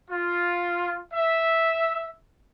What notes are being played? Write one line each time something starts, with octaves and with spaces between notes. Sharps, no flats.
F4
E5